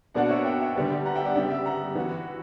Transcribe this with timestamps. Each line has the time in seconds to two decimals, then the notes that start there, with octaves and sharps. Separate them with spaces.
0.14 B2 A#3 D4 F#4 D5 F#5
0.29 C#5 E5
0.45 E5 G5
0.60 E5 G5
0.75 D3 G3 B3
1.05 F#5 A#5
1.15 E5 G5
1.25 D5 F#5
1.35 C#3 G3 B3 E5 G5
1.50 E5 G5
1.66 F#5 A#5
1.95 E3 B3 F#4